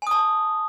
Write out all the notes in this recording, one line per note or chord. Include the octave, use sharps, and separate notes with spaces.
G#5 A5 D#6